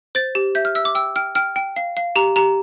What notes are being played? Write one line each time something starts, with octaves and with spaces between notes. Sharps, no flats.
C5 A6
G4
E5 G6
F6
E5 E6
D6
G5 E6
G5 F6
G5 F6
G5
F5
F5
G4 A#5
G4 A#5